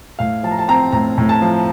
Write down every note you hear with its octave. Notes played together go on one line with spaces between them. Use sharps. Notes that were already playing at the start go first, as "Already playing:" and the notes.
A2 F5
F3 A5
A#5
A5
C4 A#5
A2 A#5
A2
A5
F3